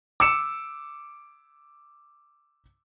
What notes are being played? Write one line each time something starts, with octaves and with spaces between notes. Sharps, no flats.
D6 E6 C#7 E7